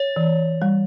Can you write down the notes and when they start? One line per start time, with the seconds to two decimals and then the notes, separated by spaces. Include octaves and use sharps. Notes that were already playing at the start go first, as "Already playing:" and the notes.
Already playing: C#5
0.16 E3
0.62 G3